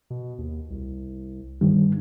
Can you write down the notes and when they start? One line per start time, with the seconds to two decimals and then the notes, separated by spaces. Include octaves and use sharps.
0.10 B2
0.38 D#2
0.70 C2
1.61 G2 D#3 G3